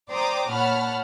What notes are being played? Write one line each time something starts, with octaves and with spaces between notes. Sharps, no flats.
C5 D5 G5 A#5 D6 D#6
A#2 C#5 F#5 A5 B5 F6